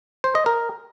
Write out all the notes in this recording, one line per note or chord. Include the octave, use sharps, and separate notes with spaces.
C5
D#5
A#4